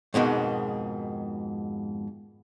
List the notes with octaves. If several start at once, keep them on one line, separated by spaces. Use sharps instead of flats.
F2 G#2 B2 D#3